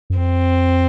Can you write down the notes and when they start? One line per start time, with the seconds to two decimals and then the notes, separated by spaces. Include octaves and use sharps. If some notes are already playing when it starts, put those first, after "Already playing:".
0.10 F#2
0.17 F2 C4